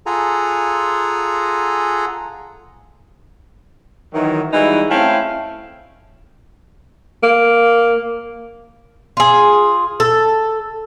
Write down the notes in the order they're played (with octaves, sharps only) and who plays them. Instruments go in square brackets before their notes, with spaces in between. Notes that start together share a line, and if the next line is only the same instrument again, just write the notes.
[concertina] F4 G#4 A4 F#5 G#5 A#5
[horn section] D#3 E3 F#3
E3 G3 G#3 D#4 E4 F#4
A3 C4 C#4 E4 F5 G5
[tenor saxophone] A#3
[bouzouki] F4 G#4
A4